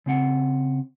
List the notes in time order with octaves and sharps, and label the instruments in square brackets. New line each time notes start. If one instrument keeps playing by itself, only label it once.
[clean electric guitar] C#3 C4 F#5